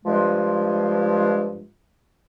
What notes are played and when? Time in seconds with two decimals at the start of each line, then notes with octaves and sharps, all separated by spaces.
0.06 G2 F3 G#3